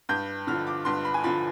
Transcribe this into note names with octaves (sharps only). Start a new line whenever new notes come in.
G2 G6
D3 F3 F6
D6
G2 C6
B5
G#5
D3 F3 B5